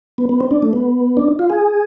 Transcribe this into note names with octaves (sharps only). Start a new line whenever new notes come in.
B3
B3
C4
D4
A3
B3
D4
F4
G#4